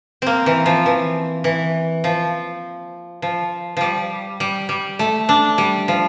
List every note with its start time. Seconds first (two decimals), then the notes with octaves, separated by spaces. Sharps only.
0.22 A#3 C4
0.46 E3
0.66 F3
0.86 E3
1.44 E3
2.04 F3
3.22 F3
3.77 F3 G3
4.40 G3
4.69 G3
4.99 A3
5.29 D4
5.58 G3
5.88 F3